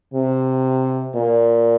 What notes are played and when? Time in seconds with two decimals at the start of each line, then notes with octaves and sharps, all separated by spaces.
0.14 C3
1.15 A#2